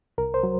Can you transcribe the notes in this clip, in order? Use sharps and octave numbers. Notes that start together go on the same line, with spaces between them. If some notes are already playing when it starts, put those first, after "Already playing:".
C2 A#4
C5
F#3